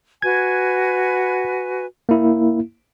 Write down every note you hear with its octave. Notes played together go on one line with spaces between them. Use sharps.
F#4 B4 G#5 G#6
A#3 E4